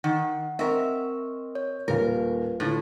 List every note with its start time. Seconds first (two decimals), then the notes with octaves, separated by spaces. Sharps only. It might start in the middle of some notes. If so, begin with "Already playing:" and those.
0.04 D#3 F#5
0.59 C4 A#4 D#5 E5 C#6
1.55 C#5
1.88 D#1 D#2 F4 A#4 B4 F5
2.60 A2 D3 F4